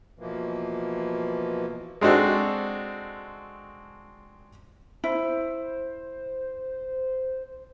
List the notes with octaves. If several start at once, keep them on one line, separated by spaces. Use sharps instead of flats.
B2 E3 F3 A#3
G#3 C4 D4 F#4 A4
E4 C5